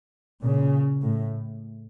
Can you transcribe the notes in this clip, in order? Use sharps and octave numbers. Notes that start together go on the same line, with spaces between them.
A#2 C#3
A2